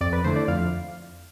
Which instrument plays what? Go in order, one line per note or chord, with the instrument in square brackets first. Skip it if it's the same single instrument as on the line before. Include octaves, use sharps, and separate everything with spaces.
[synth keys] F2 D5
B4
D3 A3 E4 C5
D5
F2 F5